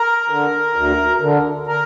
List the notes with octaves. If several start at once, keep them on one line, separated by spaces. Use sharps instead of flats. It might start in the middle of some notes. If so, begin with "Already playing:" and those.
Already playing: A#4
D3
D2
D3
A#4